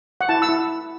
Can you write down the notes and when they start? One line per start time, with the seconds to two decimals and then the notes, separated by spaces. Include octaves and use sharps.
0.21 F#5
0.29 E4 A5
0.42 E6
0.49 E4